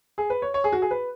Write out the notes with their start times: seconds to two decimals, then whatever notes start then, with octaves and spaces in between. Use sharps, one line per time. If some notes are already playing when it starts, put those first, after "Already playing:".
0.18 G#4
0.30 B4
0.42 C#5
0.54 C#5
0.64 G#4
0.72 F#4
0.82 G#4
0.91 B4